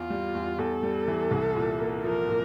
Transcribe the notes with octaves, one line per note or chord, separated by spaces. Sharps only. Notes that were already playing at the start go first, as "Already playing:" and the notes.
Already playing: E2 F4
G3
E2
E2 A4
G3
E3
C2
A#2
A#3
F3 A#4
A#2